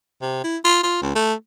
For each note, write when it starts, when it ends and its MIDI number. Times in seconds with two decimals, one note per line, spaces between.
0.22 0.43 48
0.44 0.57 64
0.64 0.81 65
0.83 0.97 65
1.02 1.12 37
1.15 1.33 57